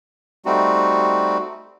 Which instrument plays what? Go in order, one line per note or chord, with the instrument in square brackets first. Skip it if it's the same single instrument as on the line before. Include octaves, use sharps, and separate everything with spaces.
[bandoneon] G3 A3 C4 D#4 F#4